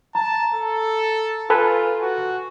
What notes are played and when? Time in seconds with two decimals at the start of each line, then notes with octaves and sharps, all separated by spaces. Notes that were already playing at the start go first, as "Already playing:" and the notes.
0.15 A5 A#5
0.54 A4
1.50 F4 A4 B4 G#5
2.02 F#4